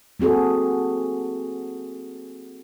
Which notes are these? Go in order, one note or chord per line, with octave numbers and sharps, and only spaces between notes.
A#3 C4 F#4 G#4 A4